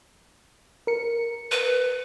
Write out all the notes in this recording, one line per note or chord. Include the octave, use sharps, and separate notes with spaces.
A#4 C#7
B4